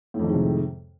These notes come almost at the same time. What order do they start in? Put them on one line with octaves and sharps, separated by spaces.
A2 F2 D#3 G#3 C3